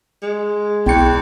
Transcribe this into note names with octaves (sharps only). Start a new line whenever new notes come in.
G#3
B1 E2 G5 C#7